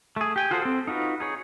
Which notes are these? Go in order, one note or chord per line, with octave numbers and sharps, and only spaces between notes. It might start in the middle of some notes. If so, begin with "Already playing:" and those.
A3 G#4
G4 G5 G#5
F4 F#4 G#4 A4 C5
C4 A4
D#4 F4 F#4 B4
D#4 G#4 C#5